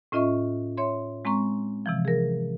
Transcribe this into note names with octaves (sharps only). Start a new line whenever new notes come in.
A2 C#4 F4 D#5 E5 C#6
C#5 E5 C6
G#3 C4 A#5 C#6
C3 E3 F3
G#4 A#4